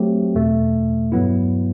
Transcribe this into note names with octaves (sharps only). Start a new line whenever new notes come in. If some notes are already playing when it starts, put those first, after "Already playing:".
Already playing: F#3 A3 C4 G4
E2 B2 A3
G2 F#3 B3 E4